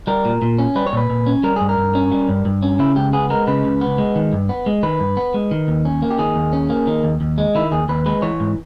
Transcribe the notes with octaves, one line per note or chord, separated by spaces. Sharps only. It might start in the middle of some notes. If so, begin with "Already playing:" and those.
G3 A#4
A#2
A#2
C#4
G3 B4
C#5
A#2 B4
A#2
C#4
G3 A#4
G2 G#4
A#4
G2
C#4
G3
G2
G2
C#4
C#3 E4
C#2 G4
B3 G#4
G#3 A#4
C#3 B4
C#2
B3
G#3
D#3
G2
B3
G#3
D#3 B4
G2
B3
G#3
D#3
D#2
C#4
A#3
G4
D#3 G#4
D#2
C#4
A#3
D#3
D#2
D#2
G#3
D#3 E4
D#2 G#4
D#2 B4
G#3 B4
E3 C#5
G#2